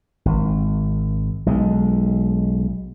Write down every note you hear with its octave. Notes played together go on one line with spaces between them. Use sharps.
G#1
B1 G#3